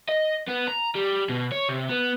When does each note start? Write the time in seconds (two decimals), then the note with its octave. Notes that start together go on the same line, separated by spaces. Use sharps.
0.08 D#5
0.48 B3
0.67 A#5
0.95 G3
1.29 B2
1.52 C#5
1.69 C3
1.89 B3